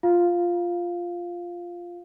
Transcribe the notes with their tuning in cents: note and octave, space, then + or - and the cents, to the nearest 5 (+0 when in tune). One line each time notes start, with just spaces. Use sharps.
F4 +0 F5 +0